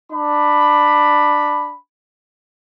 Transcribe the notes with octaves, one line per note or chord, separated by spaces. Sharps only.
D4 B5